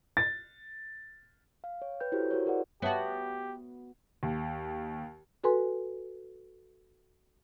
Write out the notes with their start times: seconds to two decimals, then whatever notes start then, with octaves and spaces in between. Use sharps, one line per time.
0.17 A6
1.64 F5
1.82 C#5
2.00 B4 G5 G6
2.12 E4 F#4 G4 A4 C5 C#5
2.31 F#4 A#4 C5 C#5
2.46 E4 G#4 A#4 B4 D5 F#5
2.82 B3 F#4 G4 C#5 E5 A5
4.23 D#2
5.44 F#4 A4 B4 G#5 C6